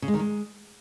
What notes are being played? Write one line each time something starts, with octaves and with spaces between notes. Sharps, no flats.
C#3
G#3
D#3
G#3